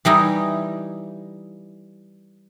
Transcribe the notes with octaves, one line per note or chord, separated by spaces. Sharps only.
E3 G3 D#4 E4